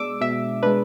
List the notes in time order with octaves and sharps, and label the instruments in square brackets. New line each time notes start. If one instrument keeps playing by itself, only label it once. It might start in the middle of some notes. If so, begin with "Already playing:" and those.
Already playing: [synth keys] B2 G#3 D4 D6 E6
B2 E5
G#3 D4 B4